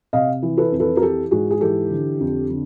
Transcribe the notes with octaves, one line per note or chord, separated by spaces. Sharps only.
C3 D#5 F5
E3
A4 B4
F2
A4 B4
A#4
E3 G4 A4
G#2 F#4 G#4
G#4
E3 G4 A4
D3
F2
D3